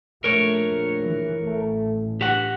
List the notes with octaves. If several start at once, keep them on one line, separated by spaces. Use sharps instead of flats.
A#1 A3 A#4 C#5
E3
A1 A3
G2 G4 F#5